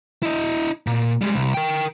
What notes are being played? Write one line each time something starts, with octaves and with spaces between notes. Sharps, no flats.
E4 D#5
A#2
G3 G#3
C2
A#4 G5